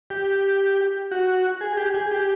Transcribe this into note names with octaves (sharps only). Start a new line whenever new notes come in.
G4
F#4
G#4
G4
G#4
G4